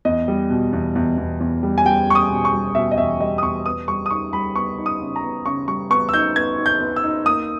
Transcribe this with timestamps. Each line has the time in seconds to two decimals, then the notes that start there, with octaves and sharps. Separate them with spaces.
0.05 E2 D#5
0.28 G3
0.50 B2
0.73 E2
0.95 E2
1.17 E2
1.40 E2
1.63 G3
1.78 G#5
1.85 G3 G5
2.07 G3 C#6
2.15 D#6
2.30 B2
2.45 C#6
2.53 G3
2.75 B2 E5
2.91 D#5
2.98 E2 E5
3.20 G3 D#5
3.38 D#6
3.43 E2 C#6
3.65 B3 D#6
3.88 G3 C#6
4.06 D#6
4.10 D#4 C#6
4.33 G3 B5
4.55 B3 C#6
4.78 D#4
4.86 D#6
5.01 C#3
5.16 A#5
5.23 B3
5.46 C#3 C#6
5.68 G3 C#6
5.90 B3 C#6
6.09 E6
6.13 D#4 G6
6.36 B3 G#6
6.58 D#4
6.66 G6
6.80 B3
6.96 E6
7.04 D#4
7.26 A#3 D#6